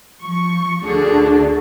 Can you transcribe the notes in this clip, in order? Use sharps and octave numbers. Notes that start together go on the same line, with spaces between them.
F3 C#6
D2 D3 D4 F#4 G#4 A4